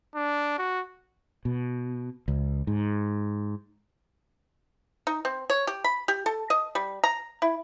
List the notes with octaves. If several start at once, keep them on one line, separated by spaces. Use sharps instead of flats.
D4
F#4
B2
C#2
G#2
D#4
C4
C#5
G4
B5
G4
A4
D#5
G3
A#5
E4